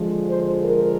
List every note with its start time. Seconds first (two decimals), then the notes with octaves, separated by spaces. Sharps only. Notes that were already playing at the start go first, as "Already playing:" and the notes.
Already playing: D3 F3 G#3
0.29 C5
0.63 A#4